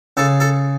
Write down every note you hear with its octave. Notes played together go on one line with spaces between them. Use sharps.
C#3 A4
A4